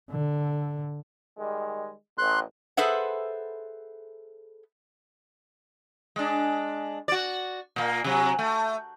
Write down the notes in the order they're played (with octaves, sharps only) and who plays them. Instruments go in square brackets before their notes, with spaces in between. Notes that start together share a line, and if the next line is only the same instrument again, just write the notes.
[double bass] D3
[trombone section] D#3 G3 G#3
[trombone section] A1 [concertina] C6 F#6
[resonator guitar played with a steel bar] G#4 A4 B4 C5 E5 F#5
[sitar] G#3 D4
F#4 D5
A#2 A#3
C3 F#3
A3